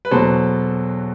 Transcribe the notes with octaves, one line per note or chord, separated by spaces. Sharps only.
B4
E2 B2 F#3 A4 C5